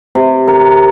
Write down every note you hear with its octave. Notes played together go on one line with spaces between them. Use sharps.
C3
A#4